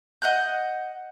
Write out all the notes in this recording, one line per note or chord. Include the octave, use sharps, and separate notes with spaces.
D#5 F#5 F#6 G6